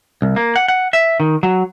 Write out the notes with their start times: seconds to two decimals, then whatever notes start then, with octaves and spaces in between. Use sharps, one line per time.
0.22 C2
0.36 A#3
0.56 F#5
0.68 F#5
0.93 E5
1.20 D#3
1.43 F#3